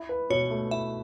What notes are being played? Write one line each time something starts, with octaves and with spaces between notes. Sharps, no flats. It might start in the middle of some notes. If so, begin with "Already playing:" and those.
Already playing: E4
B4
B2 C#5
A3
E4 E5